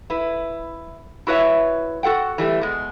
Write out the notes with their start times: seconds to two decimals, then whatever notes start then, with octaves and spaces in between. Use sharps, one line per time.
0.10 E4 B4
1.27 E4 F#4 B4 C#5 E5
2.03 F#4 A4 F#5 G5
2.38 E3 G3 A3
2.61 B2 G#3